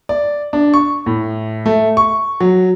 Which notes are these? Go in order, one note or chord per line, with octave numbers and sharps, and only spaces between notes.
D5
D4
C#6
A2
A3
C#6
F#3